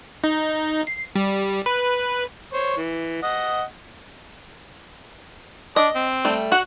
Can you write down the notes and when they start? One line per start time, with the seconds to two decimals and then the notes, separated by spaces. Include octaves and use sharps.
0.24 D#4
0.87 C7
1.15 G3
1.66 B4
2.54 C5 C#5
2.77 E3
3.23 D#5 F#5
5.76 D4 D#5
5.95 C4
6.25 G3 A3
6.52 F#4 F#5